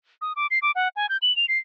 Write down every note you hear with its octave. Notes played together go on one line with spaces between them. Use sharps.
D#6
D6
C7
D6
F#5
G#5
G6
F#7
F7
C7